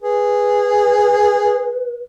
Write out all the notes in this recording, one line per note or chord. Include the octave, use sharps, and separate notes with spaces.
G#4 B4